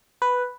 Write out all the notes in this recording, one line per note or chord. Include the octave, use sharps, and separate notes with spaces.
B4